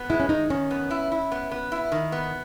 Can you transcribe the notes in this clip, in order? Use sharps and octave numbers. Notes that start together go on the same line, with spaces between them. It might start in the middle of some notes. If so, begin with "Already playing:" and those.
Already playing: B3
G#3 E4
C#4
D#3 D#4
D#3 C#4
B3
E4
E4
B3
B3
E4
D#3
B3